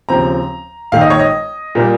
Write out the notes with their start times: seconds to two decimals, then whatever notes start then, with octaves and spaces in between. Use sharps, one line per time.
0.09 D#2 C#3 F3 C4 A#5
0.92 A#1 G#2 D#3 F5
1.01 D#5
1.10 C#5
1.20 D#5
1.75 A#2 G3 A#3